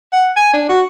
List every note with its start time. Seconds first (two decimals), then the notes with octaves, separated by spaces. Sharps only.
0.13 F#5
0.36 G#5
0.53 D4
0.69 F#4